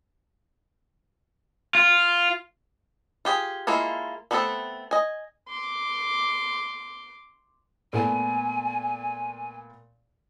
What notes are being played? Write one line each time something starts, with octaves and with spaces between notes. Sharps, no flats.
F4
F4 G4 G#4
G#3 A#3 E4 F4 A4
A3 B3 C4 F#4 A4
D#5 G#5
C6 D6
A#2 A3 B3 G#5